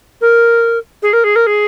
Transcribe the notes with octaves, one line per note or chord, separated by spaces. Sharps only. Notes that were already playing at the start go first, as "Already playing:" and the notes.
A#4
G#4
A#4
G#4
A#4
G#4